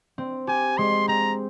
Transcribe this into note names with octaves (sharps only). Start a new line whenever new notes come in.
C4
G4 G#5
G#3 C6
C4 A#5